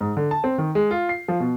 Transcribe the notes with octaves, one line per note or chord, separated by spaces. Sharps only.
G#2
D3
A5
C4
D#3
G#3
F4
C7
F3
B2